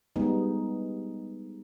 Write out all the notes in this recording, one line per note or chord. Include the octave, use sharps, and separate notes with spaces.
G3 G#3 B3 D#4